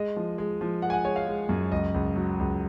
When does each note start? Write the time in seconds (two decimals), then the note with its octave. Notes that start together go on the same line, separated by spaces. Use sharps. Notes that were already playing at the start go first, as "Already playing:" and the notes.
Already playing: G#3 D#5
0.16 F3
0.38 G#3
0.61 F3
0.82 G#3 F#5
0.90 G#5
0.93 F#5
1.04 G#3 C#5
1.16 F5
1.27 G#3
1.49 F#2
1.72 C#2 D#5
1.94 C#2
2.16 F#3
2.39 C#2